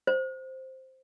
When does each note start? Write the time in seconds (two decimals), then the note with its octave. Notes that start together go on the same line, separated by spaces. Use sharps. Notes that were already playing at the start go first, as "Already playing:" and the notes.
0.07 C5